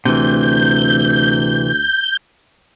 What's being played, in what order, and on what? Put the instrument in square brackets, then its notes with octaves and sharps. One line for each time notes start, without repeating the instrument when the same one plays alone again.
[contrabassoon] D2 [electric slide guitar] C3 E3 [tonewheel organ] G6